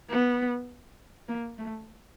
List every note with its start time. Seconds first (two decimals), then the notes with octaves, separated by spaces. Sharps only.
0.10 B3
1.29 A#3
1.58 A3